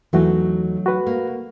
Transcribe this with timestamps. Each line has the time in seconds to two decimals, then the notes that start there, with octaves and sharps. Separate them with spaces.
0.13 E2 E3 F#3 A3 D#4 F#4
0.86 F#4 B4 F#5
1.07 A#3